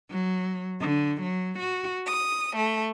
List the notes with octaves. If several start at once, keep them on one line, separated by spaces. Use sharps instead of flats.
F#3
D3
F#3
F#4
D#6
A3